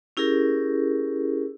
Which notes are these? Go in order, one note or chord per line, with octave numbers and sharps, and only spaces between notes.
C#4 E4 G4 G#4 A#4